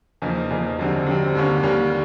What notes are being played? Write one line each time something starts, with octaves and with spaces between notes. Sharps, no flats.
E2 C#3 F3 A#3 D#4
E2 C#3 F3 A#3 D#4
F#2 D3 G3 C4
F#2 D3 G3 C4
D#2 D3 G3 A#3 C#4
D#2 D3 G3 A#3 C#4